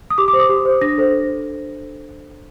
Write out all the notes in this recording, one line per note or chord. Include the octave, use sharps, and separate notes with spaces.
D#6
G4 D6
D6
C5
D#6
G4
C5
D4 A#6
A4 C5